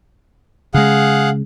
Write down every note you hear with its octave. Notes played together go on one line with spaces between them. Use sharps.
C#3 G#3 G#4 F5 F#5